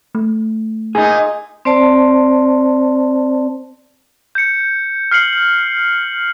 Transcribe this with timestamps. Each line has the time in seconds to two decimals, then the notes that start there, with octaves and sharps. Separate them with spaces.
0.15 A3
0.95 A#2 D#4 G#4
1.65 C4 C5 D5 A5
4.35 G6 C#7
5.11 F6 C7 C#7 F#7